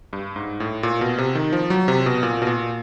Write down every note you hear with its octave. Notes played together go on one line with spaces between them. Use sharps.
G2
G#2
A2
A#2
B2
C3
D#3
F3
F#3
C3
B2
A#2
B2
A#2